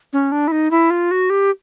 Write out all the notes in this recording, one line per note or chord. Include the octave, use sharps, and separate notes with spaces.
C#4
D4
E4
D#4
E4
F4
F#4
G4